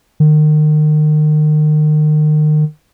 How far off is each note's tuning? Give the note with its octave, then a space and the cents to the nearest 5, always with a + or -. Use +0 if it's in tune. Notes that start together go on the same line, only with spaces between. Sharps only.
D#3 -35